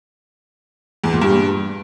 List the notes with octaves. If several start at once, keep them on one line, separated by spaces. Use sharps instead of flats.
E2
A#2
G2